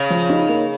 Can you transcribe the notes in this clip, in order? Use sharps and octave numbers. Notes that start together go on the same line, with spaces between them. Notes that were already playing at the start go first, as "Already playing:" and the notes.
Already playing: C#3
F3
D#4
A#3